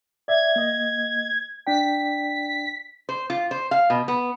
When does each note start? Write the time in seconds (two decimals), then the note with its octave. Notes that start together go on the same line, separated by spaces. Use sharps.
0.28 D5 E5 G#6
0.56 A#3 D#5
1.67 D4 D5 G5 B6
3.09 C5
3.30 F4
3.51 C5
3.71 F5
3.90 B2
4.08 B3